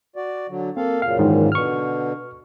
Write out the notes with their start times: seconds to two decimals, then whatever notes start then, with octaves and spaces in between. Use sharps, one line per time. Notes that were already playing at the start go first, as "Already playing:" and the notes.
0.16 F#4 D5
0.49 D3 F#3
0.77 A#3 C4 A4 F5
1.02 F#2 A#2 C#3 F5
1.19 G#2 D#3 E3
1.52 B2 D3 C#6 F6